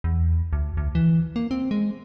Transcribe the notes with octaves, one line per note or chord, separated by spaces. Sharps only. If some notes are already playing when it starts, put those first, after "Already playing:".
E2
D2
D2
E3
A#3
C4
G#3